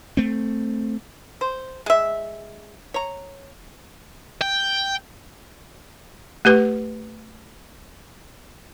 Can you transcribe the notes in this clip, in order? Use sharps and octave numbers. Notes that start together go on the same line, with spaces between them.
A3 C4
C5
G#3 E5
C#5 A#5
G5
A3 G4 B4